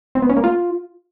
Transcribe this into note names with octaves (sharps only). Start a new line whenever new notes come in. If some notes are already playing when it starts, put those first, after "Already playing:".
C4
B3
C#4
A#3
F4